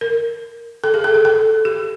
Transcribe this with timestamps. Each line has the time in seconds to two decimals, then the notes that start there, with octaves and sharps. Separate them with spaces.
0.01 A#4
0.84 A4
0.94 G#4
1.04 A4
1.14 A4
1.25 A4
1.65 G4